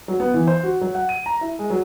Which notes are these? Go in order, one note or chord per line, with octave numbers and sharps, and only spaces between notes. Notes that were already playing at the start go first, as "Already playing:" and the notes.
F#3
B3
E3
C5
F#4
F#3
F#5
D#7
A#5
E4
G#3
F#3